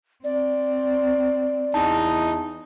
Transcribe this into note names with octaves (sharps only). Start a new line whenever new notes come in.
C4 D5
E2 D#4 A5